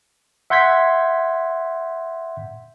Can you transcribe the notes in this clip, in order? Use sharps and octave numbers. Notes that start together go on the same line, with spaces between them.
E5 F#5 C6 G6 G#6 B6